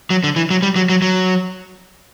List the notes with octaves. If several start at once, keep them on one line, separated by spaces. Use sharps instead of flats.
F#3
D3
E3
F#3
G3
F#3
F#3
F#3